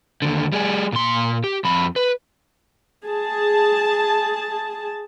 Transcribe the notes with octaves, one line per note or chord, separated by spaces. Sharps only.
D#2 D3
G3 G#4
A#2 C6
G4
F2 B5
B4
G#4 A5